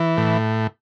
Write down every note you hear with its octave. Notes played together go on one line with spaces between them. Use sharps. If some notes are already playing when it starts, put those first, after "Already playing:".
Already playing: E3
A2